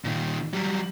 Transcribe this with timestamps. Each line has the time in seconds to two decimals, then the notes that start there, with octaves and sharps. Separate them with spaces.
0.05 A#2 D#3
0.54 F#3 G3